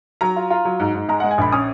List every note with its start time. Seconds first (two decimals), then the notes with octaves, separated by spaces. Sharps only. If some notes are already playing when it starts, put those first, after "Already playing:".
0.21 F#3 A#5
0.36 F4
0.50 F4
0.65 F#3
0.80 G#2
0.95 G#2
1.09 G#3 A#5
1.20 G#3 F#5
1.31 G#5
1.38 A#1 B5
1.52 C#4 D#6